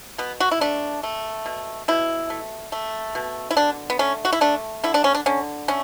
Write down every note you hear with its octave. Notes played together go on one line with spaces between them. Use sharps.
B2 B3
F#4
E4
A3 D4
A3
B2
B2 E4
A3
A3
B2
E4
D3 D4
B3
A3 C#4
F#4
E4
A3 D4
D3 E4
D4
C#4
D4
D3 C#4
A3 C#4